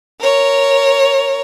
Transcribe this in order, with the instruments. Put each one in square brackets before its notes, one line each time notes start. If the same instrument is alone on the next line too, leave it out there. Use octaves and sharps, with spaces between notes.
[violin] A#4 C#5